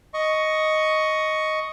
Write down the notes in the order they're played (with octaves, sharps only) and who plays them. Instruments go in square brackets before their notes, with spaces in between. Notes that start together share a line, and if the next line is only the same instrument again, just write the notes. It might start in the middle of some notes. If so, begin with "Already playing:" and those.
[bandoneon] D#5 C#6